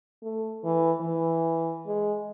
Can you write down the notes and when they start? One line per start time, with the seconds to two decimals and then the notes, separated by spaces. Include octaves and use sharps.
0.23 A3
0.64 E3
1.01 E3
1.87 G#3